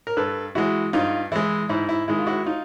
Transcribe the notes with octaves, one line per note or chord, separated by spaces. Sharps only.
A#4
G2 A4 B4
E3 G#3 E4 F#4
G2 D#4 F4
E3 G#3 E4
G#2 E4
E4
D#3 G#3 E4
F4
E4 F#4
D#4 F4